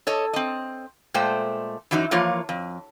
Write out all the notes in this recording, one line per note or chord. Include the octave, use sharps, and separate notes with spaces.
A4 C#5 D#5
C4 D#5
A#2 G#3 A3 C5 G5
F#2 E3 F#3 D#4 F#4
E3 F3 A#3 F4 C#5
F2